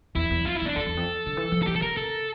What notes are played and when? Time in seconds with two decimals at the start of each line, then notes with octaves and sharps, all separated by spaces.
0.15 E2 E4
0.30 E2
0.46 F2 F4
0.56 E4
0.61 E2 D4
0.76 F2 A4
0.87 E2
0.97 F2
1.26 D3
1.37 E3
1.52 F3
1.63 A4
1.67 E3 G4
1.76 A4
1.82 C#3 A#4
1.97 A4